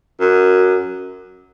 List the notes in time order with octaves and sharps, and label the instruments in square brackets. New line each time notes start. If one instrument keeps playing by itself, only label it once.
[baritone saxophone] F#2